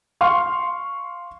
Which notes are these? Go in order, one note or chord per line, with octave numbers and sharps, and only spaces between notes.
F5 C6 C#6 F6